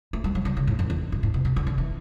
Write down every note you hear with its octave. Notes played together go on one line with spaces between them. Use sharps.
A3
G3
F#3
D3
C#3
A2
F#2
E2
G2
A2
B2
B2
D3
D3
E3